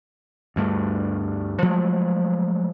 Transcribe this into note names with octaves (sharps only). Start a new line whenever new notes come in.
D2 G2 A3
F3 F#3 G#3 A3